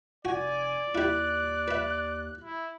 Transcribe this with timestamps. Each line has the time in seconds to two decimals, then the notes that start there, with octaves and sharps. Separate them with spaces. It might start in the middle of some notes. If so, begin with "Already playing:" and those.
0.25 F1 F#4 D5 G#5
0.95 D#2 E4 G4 F#6
1.68 B4 E5
2.44 E4